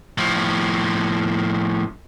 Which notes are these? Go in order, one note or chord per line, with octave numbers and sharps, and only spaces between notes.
A2 F3